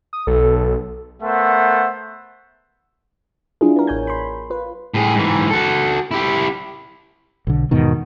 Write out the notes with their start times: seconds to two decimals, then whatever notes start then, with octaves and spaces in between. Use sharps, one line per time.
0.13 D#6
0.27 B1 A4
1.22 A3 B3 A#4 C5 E5 F#5
3.61 F#3 D4 E4 F4 G#4
3.76 B3 A#4
3.87 A1 C#5 G#5 G6
4.07 B5 C6
4.50 F4 B4
4.94 A2 G#4
5.15 G#2 E3
5.50 F#4 A4
6.11 E4 G4
7.47 B1 D3
7.71 E2 G#2 B2 D#3